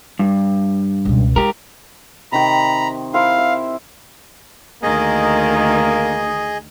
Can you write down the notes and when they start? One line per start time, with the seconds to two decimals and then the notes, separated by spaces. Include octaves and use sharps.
0.19 G2
1.05 C#2 B2
1.36 G#3 G4 A#4
2.32 C3 D#3 G5 A#5 B5
3.14 E4 A#4 C5 F5
3.38 E5
4.83 D2 D#3 A#3 G#4 D#5